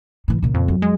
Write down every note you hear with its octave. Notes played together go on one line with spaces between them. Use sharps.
A2 E3
A#2 C#3
F2
F#2
G#3